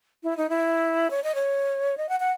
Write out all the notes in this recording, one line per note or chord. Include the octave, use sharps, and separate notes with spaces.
E4
D#4
E4
C#5
D#5
C#5
D#5
F#5
F#5